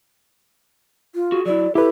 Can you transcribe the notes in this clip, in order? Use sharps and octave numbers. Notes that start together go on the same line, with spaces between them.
F4
F#4 G#4
F#3 E4 D5
E4 G4 A4 B4